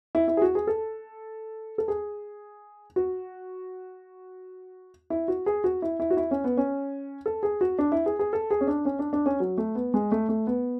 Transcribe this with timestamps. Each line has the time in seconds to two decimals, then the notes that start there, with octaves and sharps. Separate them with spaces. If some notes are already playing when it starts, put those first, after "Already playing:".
0.15 E4
0.28 E4
0.37 G#4
0.42 F#4
0.55 G#4
0.67 A4
1.78 A4
1.88 G#4
2.96 F#4
5.10 E4
5.28 F#4
5.46 G#4
5.64 F#4
5.82 E4
6.00 E4
6.11 F#4
6.17 E4
6.31 C#4
6.44 B3
6.57 C#4
7.26 A4
7.43 G#4
7.61 F#4
7.79 D4
7.92 E4
8.06 G#4
8.19 G#4
8.33 A4
8.51 G#4
8.61 C#4
8.67 D4
8.85 C#4
8.99 D4
9.13 D4
9.26 C#4
9.40 F#3
9.58 A3
9.75 B3
9.94 G#3
10.12 A3
10.29 A3
10.47 B3